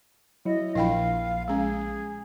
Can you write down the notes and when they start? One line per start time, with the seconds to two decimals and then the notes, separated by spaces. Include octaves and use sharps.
0.45 F#3 E4 D#5
0.75 A#1 E4 F5 G5 B5
1.48 G#3 C#4 G#4